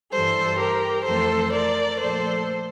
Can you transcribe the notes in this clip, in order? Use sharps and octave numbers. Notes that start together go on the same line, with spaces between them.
G2 E3 G3 A4 C5
G4 A#4
F2 E3 A3 A4 C5
A#4 D5
A#2 F3 A3 A4 C5